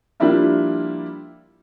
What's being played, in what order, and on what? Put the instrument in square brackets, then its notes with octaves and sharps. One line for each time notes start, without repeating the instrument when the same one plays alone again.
[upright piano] F3 G3 A#3 D4 E4 F4